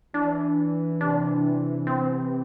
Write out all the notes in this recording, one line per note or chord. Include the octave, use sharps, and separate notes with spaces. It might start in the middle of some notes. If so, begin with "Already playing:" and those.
E3 D4
C3 D4
C4